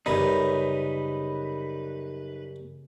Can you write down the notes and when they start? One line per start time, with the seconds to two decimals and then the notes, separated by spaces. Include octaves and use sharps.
0.06 F#2 C#3 G3 D#4 B4